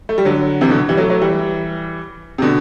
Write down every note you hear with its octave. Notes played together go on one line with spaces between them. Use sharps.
A3
G3
D3 F#3
C3 E3
B2 D3
E3 G3
F#3 A3
F#3 A3
E3 G3
C3
B2 D3